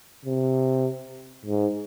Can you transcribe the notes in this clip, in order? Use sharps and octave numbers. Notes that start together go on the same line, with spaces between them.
C3
G#2